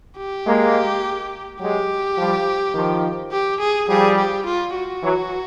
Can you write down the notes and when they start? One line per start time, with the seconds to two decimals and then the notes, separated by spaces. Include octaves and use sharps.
0.18 G4
0.47 G#3 A#3
1.61 F#3 G#3 G4
2.18 F3 G3
2.74 D#3 F3
3.32 G4
3.60 G#4
3.89 F3 G3 G#4
4.18 G4
4.46 F4
4.75 F#4
5.03 E3 F#3